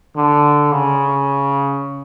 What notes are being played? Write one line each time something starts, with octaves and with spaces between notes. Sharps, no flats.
D3
C#3